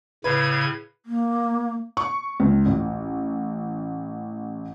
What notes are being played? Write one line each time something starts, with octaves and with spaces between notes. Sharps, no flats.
A2 C#3 B4 G#6
A#3
C#6
C#2
A1